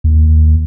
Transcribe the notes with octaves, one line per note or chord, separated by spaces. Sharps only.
D#2